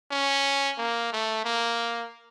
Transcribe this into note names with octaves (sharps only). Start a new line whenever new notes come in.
C#4
A#3
A3
A#3